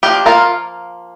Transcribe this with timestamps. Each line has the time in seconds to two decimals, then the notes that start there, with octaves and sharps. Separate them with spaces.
0.03 F3 A#3 D4 G4
0.26 F4 A#4